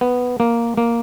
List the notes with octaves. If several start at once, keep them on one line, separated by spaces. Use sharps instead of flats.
B3
A#3
A#3